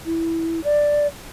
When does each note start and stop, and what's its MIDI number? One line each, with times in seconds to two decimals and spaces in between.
0.06 0.63 64
0.64 1.07 74